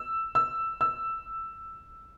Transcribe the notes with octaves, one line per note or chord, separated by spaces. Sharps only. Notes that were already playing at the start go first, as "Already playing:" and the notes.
Already playing: E6
E6
E6